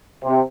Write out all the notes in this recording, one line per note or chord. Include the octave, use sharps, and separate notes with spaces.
C3